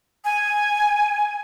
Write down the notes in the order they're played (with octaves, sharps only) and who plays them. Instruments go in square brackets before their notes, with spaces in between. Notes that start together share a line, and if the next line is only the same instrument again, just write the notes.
[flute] G#5